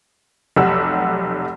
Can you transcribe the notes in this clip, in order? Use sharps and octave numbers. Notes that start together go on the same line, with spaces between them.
F1 B1 G4 F#5 E6